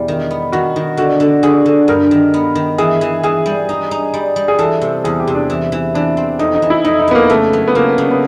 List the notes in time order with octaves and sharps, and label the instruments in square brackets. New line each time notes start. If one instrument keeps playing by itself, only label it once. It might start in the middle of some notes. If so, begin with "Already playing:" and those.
Already playing: [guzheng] E2 B2 G3
D#3
B3
[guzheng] D#3 [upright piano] F#4
[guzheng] D#3
[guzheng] D3 [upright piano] F#4
[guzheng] D3
[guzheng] D3 [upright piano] G#4
[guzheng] D3
[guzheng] G2 [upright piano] A#4
[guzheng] D#3
B3
D#3
[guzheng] E3 [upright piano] G#4
[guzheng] E3
[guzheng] E3 [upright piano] G#4
[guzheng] G3
D#4
D#4
G3
G3
[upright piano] G#4
[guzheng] E3 [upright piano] A4
[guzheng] C3
[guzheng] E2 [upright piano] G#4
[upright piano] G4
[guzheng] C3
[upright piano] D4
[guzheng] E3
E3
[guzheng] E3 [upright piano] D4
[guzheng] C4
[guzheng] F2 [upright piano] D#4
[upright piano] D#4
[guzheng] E3
[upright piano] E4
[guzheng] F2 [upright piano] D#4
[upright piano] D#4
[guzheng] F2 [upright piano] B3
[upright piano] A#3
[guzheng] C#3 [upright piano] A3
[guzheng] F#3
[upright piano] B3
[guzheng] C#3 [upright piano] A#3
[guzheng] C#3
[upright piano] B3